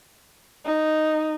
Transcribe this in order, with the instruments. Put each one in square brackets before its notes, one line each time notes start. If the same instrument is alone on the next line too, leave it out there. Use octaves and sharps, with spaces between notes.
[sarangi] D#4